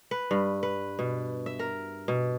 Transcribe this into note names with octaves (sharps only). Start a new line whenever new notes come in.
B4
G2
B4
B2
E5
A#4
B2